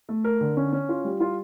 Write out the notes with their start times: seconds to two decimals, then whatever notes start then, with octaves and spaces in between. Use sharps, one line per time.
0.09 A3
0.24 A#4
0.41 D3
0.57 C#4
0.73 C#4
0.89 F4
1.04 G3
1.20 F4